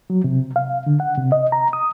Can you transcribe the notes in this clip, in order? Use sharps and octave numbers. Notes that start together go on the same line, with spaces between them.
F#3
C3
F5
D3
F#5
C3
D#5
A#5
D#6